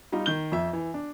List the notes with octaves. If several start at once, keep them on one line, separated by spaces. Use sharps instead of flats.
G3 D#4 F4
D#3 G6 G7
F2 E5
E3
D4